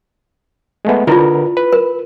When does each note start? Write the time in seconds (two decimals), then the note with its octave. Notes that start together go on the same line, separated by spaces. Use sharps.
0.85 G#3 A3 B3
1.07 D3 E4 F4 A#4 B4
1.57 B4
1.73 A#4